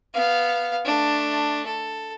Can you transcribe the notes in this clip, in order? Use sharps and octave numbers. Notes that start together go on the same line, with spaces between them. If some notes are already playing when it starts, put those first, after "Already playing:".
B3 F5
A3 D4
A4